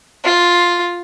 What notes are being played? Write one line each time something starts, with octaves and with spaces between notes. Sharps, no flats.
F4